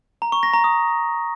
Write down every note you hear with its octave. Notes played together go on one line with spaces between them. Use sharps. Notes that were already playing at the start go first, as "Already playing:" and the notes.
A#5
C#6
A#6
A#5
D#6